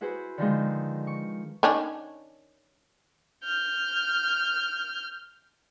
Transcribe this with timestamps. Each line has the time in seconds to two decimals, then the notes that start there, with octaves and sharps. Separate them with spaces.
0.01 E4 F#4 G#4 B4 C5 B5
0.38 D3 D#3 F3 G#3
1.07 C#6
1.63 D#3 C#4 D4
3.44 F6 G6